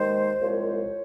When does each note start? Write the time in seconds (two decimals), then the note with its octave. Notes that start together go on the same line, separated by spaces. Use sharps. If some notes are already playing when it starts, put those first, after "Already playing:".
Already playing: D#2 D#3 G#3 C5
0.41 C2 A#2 F3 G#3 C#5